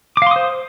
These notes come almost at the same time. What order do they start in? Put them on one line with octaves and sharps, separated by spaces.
D6 F5 C6 D#6 C5